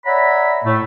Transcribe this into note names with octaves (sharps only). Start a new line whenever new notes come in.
C#5 D5 E5 F#5 A#5 B5
A2 A3